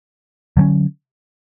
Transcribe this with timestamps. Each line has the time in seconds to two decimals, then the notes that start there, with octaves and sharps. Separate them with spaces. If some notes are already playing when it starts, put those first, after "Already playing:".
0.57 D3 F#3 A3 C#4